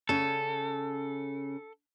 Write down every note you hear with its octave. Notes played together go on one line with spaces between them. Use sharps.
C#3 C#4 A4